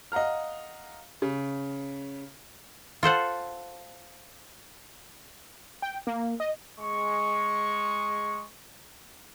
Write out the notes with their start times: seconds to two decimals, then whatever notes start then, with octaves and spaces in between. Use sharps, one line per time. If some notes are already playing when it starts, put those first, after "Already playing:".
0.12 D#5 F5 F#5 A#5 F6
1.22 C#3
3.03 F4 A4 C5 F#5
5.82 G5
6.07 A#3
6.40 D#5
6.81 G#3 C#6